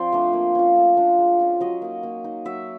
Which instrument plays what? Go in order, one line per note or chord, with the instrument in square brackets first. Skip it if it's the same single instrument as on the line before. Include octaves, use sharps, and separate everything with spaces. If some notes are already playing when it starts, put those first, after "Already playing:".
Already playing: [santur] F3 C4 C5 D5
A3 D4
A#3
C#4 F4
A3
D4 F4
G#3
C#4 F4
F#3 D#5
A#3 D#4
A#3
D#4
F#3 E5